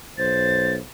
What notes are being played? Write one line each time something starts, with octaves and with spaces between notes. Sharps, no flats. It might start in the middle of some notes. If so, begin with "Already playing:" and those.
B1 C5 A6